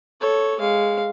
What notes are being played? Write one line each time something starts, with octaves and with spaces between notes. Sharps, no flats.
A4 C#5
G#3 F5